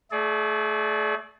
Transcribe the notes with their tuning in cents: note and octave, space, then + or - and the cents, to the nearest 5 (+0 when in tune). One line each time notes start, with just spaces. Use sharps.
A3 +0 G#4 +40 D5 +0